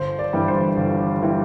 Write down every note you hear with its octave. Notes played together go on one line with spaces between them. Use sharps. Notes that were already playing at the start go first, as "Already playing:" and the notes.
Already playing: G1 C5
D5
G2 E3 G3
C5
G1
E3 G3